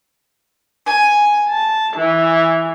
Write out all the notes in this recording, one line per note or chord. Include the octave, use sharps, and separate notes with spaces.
G#5
A5
E3